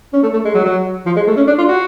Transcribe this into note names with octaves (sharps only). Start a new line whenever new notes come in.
C#4
A3
A3
G#3
F#3
F#3
F3
G#3
A3
C#4
D4
F4
F#4